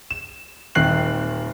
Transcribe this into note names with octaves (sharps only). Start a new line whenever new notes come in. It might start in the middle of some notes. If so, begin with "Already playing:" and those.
E7
D#1 D#3 C4 F#6 C7 F#7